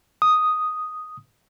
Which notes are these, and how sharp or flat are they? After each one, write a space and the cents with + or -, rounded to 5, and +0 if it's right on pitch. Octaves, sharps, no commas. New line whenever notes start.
D#6 +0